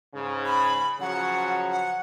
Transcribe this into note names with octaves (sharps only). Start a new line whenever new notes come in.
G#2 C#3
B5
C#3 F3 F#3 F#5
F#5